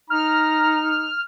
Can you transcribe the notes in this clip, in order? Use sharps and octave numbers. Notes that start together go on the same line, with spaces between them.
D#4 A#5 F6